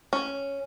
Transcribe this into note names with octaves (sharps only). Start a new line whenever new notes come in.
C#4